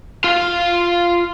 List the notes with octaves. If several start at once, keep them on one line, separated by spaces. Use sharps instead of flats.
F4 F5